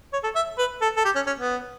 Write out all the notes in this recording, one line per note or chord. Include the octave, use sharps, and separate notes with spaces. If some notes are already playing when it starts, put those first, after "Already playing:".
C#5
A4
E5
B4
A4
A4
G4
C#4
C#4
B3